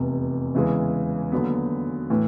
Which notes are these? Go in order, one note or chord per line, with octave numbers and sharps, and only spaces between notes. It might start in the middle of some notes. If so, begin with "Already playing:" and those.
Already playing: F1 E2 C3
E2 C#3 E3 G#3
D#2 D3 F#3 B3
A2 E3